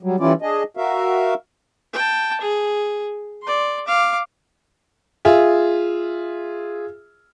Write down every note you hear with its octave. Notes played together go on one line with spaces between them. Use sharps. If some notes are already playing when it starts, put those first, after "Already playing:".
F#3 G3
E3 G3 C#4 E4 F4 D5
D4 G#4 D#5
F#4 A#4 E5 F5
G5 A5
G#4
D5 C6
F5 D6
F4 G#4 E5